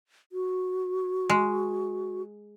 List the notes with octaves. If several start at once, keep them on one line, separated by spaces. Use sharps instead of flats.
F#4
G#3